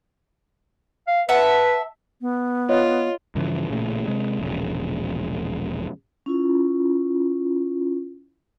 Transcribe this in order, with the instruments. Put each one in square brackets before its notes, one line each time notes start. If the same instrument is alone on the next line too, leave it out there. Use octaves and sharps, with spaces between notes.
[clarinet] F5
[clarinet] B4 [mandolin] E5 F#5 A5
[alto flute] B3
[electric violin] F4 [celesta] C#5 D#5
[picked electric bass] G2 C#3 E3 F3
A1 A#2 C#3 A3
C3 G#3
E1 A#1 C#3
[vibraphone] C#4 E4 F4